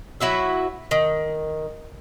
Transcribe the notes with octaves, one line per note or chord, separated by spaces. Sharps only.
F#3 E4 F#4 E5
D#3